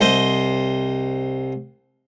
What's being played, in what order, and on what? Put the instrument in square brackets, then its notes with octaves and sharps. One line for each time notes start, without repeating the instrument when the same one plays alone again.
[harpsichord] C2 C5 D#5